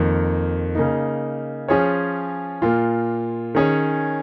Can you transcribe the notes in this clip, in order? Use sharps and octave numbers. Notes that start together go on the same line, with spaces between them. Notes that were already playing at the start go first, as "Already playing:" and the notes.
Already playing: F2 D#3 A#3
C#3 A#3 D#4
F3 C#4 F4 G#4 C#5
A#2 A#3 F4
D#3 C#4 G#4 C#5